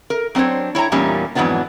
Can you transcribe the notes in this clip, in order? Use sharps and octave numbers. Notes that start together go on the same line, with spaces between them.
A#4
F#3 C4 D4 C5 C#5
E4 C#5 G5 A#5
E2 A#2 G3 A#3 C#4 D#4
F2 G#2 E3 F#3 B3 D4